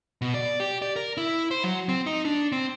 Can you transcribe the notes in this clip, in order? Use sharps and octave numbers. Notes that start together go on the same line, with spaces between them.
B2
D5
G4
D5
A#4
E4
C5
F#3
C4
D#4
D4
C4